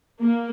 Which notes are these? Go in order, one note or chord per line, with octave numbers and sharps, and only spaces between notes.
A#3